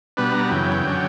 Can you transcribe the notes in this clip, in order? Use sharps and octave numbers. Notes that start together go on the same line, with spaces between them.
B2 G3 B3 D4 B4
A#5
F#2 C#3 E3 G5
D3 F#3 C#4